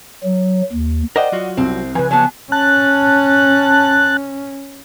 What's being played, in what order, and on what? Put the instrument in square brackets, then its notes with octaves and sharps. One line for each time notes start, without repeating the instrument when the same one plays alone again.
[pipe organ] F#3
D#2
[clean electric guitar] A#4 C5 G5 [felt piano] D5 D#5 F#5
[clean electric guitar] F#3 F4 F#4
[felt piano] C2 [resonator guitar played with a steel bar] C4
[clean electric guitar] C#3 F3 [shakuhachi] B4 [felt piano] G#5
[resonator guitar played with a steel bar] F#3 B3 [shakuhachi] A5
[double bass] C#4 [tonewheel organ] A5 F#6